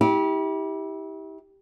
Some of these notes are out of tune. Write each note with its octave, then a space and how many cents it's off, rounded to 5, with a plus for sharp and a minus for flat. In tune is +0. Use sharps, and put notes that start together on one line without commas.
E4 -35 G4 +0